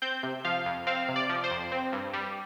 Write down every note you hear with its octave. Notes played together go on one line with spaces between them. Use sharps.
C4 G6
C3
F3 F5
F2
C4 F5
C3
D5
F3
C5
F2
C4
G2
G3